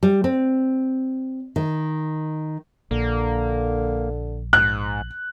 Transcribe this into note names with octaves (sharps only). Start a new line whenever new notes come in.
G3
C4
D#3
A#1 D3 A#3
G#2 F#6